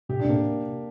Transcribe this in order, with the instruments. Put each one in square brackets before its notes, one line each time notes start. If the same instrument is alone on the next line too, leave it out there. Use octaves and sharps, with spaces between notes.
[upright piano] C3 [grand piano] G4
[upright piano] C3 [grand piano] D4
[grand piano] A#3